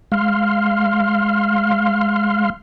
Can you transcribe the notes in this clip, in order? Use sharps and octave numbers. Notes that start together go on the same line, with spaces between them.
G#3 F5 C6 F6